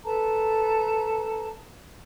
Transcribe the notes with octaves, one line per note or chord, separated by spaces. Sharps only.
A4 B4 A5 A#5